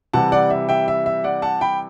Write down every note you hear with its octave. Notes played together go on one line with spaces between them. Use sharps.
C3 E3 G3 F#5 A5
D5 F#5
E5
E5 G5
E5
E5
D5 F#5
F#5 A5
G5 B5